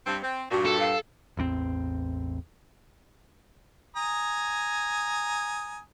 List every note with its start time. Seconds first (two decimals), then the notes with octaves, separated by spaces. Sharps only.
0.06 G2 C4
0.23 C4
0.51 G2 A#2 F#4
0.66 A4
0.80 F5
1.37 A1 E2 A#3 C4
3.96 G#5 A#5 D#6